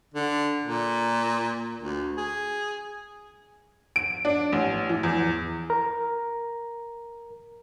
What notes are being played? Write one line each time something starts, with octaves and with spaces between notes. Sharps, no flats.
D3
A#2
D2
G#4
D7
D4
A1
E3
E2
A#4 A#5